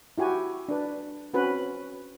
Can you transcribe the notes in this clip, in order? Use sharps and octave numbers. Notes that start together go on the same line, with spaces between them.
E4 F#4 G4 G#5
D4 B4
C4 C#4 F#4 B4